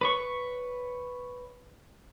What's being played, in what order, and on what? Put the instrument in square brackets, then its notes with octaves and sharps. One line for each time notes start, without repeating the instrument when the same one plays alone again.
[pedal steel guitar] B4 C#5 C#6